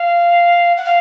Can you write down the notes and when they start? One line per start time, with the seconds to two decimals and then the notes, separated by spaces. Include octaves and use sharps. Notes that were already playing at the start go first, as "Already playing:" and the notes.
Already playing: F5
0.77 F#5
0.85 F5